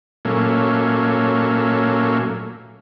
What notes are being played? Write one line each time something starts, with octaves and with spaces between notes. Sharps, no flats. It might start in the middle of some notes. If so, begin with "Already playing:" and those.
A#2 F#3 A3 A#3 C#4